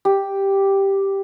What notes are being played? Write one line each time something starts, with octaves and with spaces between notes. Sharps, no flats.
G4